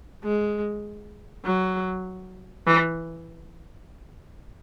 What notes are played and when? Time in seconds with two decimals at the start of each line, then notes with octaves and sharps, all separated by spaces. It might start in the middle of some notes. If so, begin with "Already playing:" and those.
0.24 G#3
1.45 F#3
2.67 E3